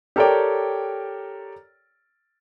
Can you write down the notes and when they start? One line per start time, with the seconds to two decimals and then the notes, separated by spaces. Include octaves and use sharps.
0.16 G4 A4 A#4 C#5 D5 G5